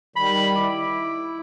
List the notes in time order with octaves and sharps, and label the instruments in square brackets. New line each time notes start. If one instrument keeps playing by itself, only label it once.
[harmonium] D#3 G3 [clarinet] B5
[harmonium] E4 [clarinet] D6